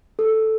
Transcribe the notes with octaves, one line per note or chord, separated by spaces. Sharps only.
A4